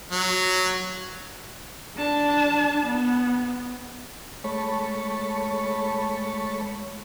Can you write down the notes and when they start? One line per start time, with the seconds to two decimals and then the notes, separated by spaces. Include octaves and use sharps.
0.11 F#3
1.96 D4 A5
2.86 B3
4.44 G#3 A3 C#5 A5 B5 C#6